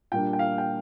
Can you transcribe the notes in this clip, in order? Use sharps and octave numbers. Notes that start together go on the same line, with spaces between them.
A#2 G3 A#3 D4 G5
G5
F5
G5